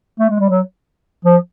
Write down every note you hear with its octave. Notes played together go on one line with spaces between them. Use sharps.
A3
G#3
G3
F#3
F3